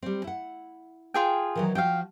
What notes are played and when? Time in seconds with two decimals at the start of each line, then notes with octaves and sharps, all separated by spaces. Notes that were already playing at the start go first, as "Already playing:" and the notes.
0.03 G3 C4
0.24 E4 F#5
1.14 F4 G#4 G5
1.55 D#3 E3 F#3
1.75 F3 F#4 F5 G5